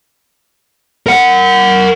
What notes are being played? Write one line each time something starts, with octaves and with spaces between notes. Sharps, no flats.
A#4 F#5